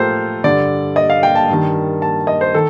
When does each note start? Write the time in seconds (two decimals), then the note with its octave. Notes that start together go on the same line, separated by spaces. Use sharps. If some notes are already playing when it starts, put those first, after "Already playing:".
Already playing: A2 F4 G4 A4 A#4 C5
0.44 G2 D3 D5
0.96 D#5
1.10 F5
1.23 G5
1.35 A5
1.49 G2 D#3
2.02 A5
2.27 D#5
2.41 C5
2.54 D#3 A4